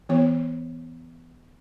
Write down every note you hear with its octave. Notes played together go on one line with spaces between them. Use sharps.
E3 B3 C#5